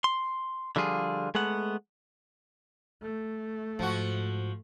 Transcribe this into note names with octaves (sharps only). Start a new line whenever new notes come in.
C6
D3 F3 G3 F4 G#4
G#3 A3 B3 F#5
A3
G#2 F3 F#4